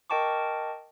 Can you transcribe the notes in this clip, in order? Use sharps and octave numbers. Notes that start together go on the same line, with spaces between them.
A#4 D#5 G5 A5 C#6 D6